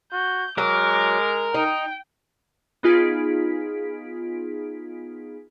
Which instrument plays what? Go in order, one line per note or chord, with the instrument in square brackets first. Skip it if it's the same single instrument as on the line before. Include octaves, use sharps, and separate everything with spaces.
[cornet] F#4 [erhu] G6
[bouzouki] F#3 [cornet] G#3 [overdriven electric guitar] A#4 [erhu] D6
[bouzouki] D#4 [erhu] G5
[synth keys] B3 D#4 F4 G#4 B6 D7